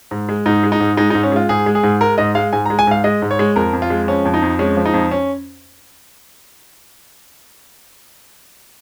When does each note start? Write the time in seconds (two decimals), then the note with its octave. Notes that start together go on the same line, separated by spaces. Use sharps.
0.11 G#2
0.29 G#3
0.46 G#2 D#4
0.63 G#3
0.72 D#4
0.80 G#2
0.97 G#3 D#4
1.10 D#4
1.15 G#2
1.23 C#4
1.32 G#3 F4
1.49 G#2 G#4
1.66 G#3
1.75 G#4
1.83 G#2
2.01 G#3 A#4
2.18 G#2 D#5
2.35 G#3 F5
2.53 G#2 G#5
2.66 A#5
2.70 G#3
2.79 G#5
2.87 G#2 F5
3.04 G#3 D#5
3.22 G#2
3.31 C#5
3.39 G#3
3.56 F2 A#4
3.73 F2
3.82 F4
3.90 G#3
4.08 F3 C#4
4.25 F2
4.34 D#4
4.42 F2
4.59 G#3 C#4
4.77 F3
4.86 D#4
4.94 F2
5.11 C#4